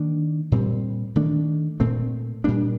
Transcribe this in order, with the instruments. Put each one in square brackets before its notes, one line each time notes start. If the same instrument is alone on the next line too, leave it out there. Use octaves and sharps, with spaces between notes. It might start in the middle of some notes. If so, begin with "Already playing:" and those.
Already playing: [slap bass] D#3 A#3 D4
A#2 G3 C4
D#3 A3 D4
A#2 A3 C4
A#2 G3 A#3 D4